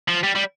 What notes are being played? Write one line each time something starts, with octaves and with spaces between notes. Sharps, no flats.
F3
G3
G3